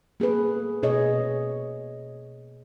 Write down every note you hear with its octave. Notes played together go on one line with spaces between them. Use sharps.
A#3 G#4 A4 B4
B2 G#4 C#5 D#5
B2